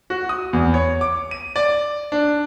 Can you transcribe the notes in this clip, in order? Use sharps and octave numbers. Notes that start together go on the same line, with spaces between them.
F#4
D#6
E2
C#5
D6
D#7
D5
D4